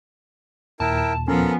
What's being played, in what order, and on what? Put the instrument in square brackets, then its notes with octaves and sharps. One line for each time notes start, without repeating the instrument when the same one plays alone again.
[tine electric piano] D#2 A#2 [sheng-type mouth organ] E4 A#4 G5 [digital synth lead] A5
[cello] F3 B3 [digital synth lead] C#4 [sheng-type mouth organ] A4 A#4